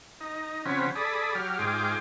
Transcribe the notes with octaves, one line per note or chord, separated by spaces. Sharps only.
D#4
C#3 F3 C4 C#4 F#5 B5
G#4 A4 D5 B5 D#6
F#3 G4 F6
G#2 F4 G#4 G5 D6